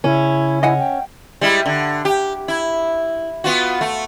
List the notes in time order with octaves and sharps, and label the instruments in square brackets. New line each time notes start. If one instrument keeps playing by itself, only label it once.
[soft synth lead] C#3 [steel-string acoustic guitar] C#4 [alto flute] E4
[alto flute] E4 [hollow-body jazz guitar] D#5 F#5 G#5
[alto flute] G5
[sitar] G3 G#3 E4
D3
G4
E4
B3 F4 F#4
A3